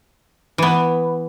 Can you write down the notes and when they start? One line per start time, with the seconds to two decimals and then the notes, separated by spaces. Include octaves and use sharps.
0.58 E3 B3